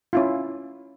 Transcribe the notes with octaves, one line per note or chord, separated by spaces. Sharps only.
C#4 E4 F4